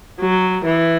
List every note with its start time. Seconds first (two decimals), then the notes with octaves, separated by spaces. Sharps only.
0.20 F#3
0.65 E3